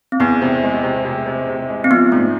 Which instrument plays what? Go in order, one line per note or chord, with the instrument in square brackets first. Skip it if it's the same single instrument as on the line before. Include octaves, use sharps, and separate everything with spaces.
[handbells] C4
[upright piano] E2 [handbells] B3
[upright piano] C3
G#3
C3
C3
C3
C3
G#3
[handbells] C4
[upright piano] F3 [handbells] B3
[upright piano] G#2 [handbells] A3